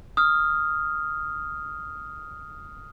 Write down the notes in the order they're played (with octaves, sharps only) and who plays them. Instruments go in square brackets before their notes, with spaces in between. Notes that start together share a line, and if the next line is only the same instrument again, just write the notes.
[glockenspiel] D#6 F6